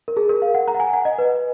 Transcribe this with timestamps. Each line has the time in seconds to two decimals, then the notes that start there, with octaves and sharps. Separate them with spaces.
0.08 A#4
0.17 G#4
0.29 A#4
0.42 F5
0.54 F#5
0.68 A#5
0.74 F#5
0.80 G#5
0.93 F#5
1.05 D#5
1.18 B4